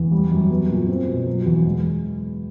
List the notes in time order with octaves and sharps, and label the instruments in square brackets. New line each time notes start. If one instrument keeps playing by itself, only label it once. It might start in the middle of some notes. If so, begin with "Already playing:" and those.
Already playing: [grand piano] E2
G3
F#2
B3
A#2
C4
B2
F#3
E2
G#3